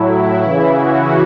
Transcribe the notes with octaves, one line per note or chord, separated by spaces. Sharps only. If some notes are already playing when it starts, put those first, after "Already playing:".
Already playing: A2 F#3 E4
C#3 E3
F#4